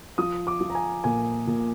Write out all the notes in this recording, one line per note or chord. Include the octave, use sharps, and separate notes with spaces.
F3 D#6
D6
F3
A#5
G#5
A#2 G#5
A#2